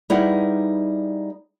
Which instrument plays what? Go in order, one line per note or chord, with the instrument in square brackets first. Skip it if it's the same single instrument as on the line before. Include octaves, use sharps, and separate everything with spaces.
[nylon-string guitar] G3 D#4 E4 G#4 B4 F#5